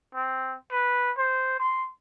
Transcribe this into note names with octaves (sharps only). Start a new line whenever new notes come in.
C4
B4
C5
C6